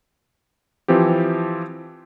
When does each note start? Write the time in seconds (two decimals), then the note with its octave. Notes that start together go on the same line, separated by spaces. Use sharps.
0.88 E3 F3 C4 G4